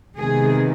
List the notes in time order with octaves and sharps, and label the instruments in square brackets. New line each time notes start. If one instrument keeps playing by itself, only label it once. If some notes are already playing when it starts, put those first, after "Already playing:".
[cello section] C3 D#3 G#3 B3 G#4